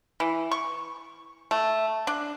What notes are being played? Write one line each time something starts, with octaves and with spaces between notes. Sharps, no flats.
E3
C#6
A3
D4